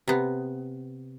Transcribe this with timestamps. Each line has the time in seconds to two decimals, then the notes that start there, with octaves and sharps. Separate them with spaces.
0.08 C3 B3